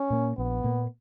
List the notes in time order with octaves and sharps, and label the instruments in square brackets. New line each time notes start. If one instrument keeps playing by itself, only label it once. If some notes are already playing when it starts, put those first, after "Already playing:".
Already playing: [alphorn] C#4
[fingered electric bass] A#2 A#3
[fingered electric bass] A#1 [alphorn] B3
[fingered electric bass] A#2 A#3